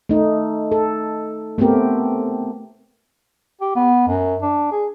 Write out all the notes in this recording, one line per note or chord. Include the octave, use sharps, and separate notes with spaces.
A3 D#4
A4
A3 B3 C4 G4 A#4
G4
B3
F#2
D4
G#4